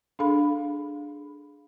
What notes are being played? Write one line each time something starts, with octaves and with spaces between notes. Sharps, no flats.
D4 G#4 A4 F5 B5